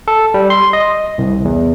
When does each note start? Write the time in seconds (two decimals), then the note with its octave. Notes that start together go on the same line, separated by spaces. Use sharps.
0.08 A4
0.34 G3
0.50 C6
0.73 D#5
1.18 C2
1.45 E2